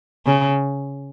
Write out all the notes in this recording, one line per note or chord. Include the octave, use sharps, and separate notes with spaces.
C#3